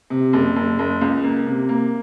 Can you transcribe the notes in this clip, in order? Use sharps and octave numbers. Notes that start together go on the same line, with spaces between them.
C3
F#1
F#1
F#1
C#2
A#3
C3
A#3